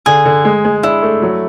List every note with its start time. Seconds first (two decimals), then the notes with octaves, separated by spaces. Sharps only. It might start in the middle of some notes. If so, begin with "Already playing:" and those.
0.06 D3 G#4
0.25 D3
0.45 G#3
0.65 G#3
0.83 D4 E4
1.02 A3
1.22 F#3